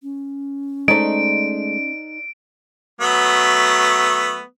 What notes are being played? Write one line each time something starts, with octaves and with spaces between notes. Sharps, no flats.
C#4
G#3 A3 D#4 C5 D5 D7
F#3 A3 B3